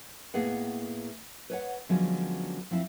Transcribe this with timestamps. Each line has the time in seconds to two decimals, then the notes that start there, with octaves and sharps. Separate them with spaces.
0.34 A2 A#3 B3 G#4 B4 F#5
1.50 B4 C#5 F#5
1.89 D3 F3 F#3 G#3 B3 C#4
2.71 F3 C4 E4